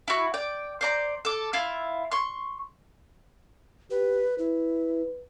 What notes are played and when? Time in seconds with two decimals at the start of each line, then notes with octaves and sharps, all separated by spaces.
0.08 E4 F#4
0.34 D5 G5
0.81 C5 D5 A#5
1.25 A4 D6
1.53 E4 F4 E5
2.12 C6 C#6
3.91 G4 B4
4.38 E4 B4